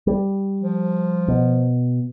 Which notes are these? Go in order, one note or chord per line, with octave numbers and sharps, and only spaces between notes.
G3
F3
B2